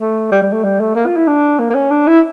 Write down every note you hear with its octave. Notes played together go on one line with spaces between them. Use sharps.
A3
G3
G3
A3
G3
A3
A#3
F4
E4
D4
A#3
A#3
C#4
D4
E4